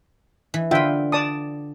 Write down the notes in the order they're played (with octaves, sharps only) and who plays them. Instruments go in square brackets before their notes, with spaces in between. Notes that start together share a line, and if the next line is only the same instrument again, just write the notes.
[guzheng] E3
[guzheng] D3 B4 [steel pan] F4 E5 G5
[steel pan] D5 A5 D#6